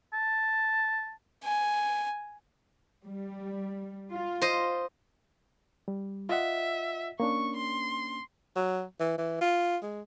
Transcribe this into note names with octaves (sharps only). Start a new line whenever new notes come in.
A5
G#5
G3
F4
C5 D#5
G3
F4 D#5 E5 F#5
A#3 C#4 D4 C#6
C6
F#3
E3
E3
F4
G#3